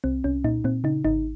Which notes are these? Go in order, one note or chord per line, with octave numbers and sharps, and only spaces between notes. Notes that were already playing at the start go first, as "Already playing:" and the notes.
C2 C4
C2 C#4
A#2 D#4
A#2 C4
C#3 D#4
G#1 D#4